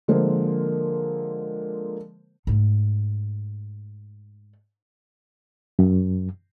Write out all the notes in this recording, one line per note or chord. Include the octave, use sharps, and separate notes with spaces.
D3 F3 G#3 A#3 C5
G#2 A3
F#2